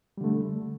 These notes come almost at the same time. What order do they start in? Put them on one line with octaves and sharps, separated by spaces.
G3 D3 A3